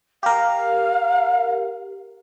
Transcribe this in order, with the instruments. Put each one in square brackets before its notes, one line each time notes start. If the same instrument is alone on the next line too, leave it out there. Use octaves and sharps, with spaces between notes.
[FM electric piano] G4 A#4 [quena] F5